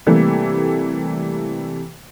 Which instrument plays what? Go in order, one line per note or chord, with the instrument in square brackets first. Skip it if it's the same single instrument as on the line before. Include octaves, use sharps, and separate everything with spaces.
[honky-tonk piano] C3 E3 G3 A3 A#3